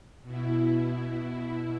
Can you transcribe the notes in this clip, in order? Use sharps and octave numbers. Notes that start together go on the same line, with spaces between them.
B2 E4